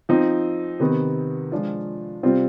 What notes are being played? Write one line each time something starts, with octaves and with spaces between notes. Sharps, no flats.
F3 C4 D#4
C3 D#3 B3
F3 G#3 D4 F4
C3 G3 C4 F4